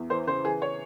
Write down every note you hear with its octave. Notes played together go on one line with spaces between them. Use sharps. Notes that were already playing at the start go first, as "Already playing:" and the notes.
Already playing: E2
E3 C5
C#3 C5
E3 G#4
C#5